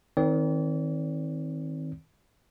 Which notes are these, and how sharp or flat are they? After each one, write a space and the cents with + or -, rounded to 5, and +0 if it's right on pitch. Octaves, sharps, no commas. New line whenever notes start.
D#3 +20 C4 +0 D5 -40